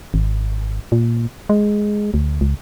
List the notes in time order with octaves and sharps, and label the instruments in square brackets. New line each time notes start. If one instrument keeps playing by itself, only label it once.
[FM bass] G#1
A#2
G#3
D2
C#2